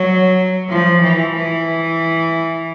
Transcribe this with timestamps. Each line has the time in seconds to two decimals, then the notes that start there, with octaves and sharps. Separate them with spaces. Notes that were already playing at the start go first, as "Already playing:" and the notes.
Already playing: F#3
0.70 F3
1.02 E3
1.36 E3